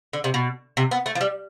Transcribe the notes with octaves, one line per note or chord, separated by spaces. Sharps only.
D3
C3
B2
C3
B3
A3
F3
G3